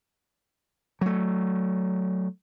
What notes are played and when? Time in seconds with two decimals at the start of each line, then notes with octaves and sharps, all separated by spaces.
1.01 F#3 A3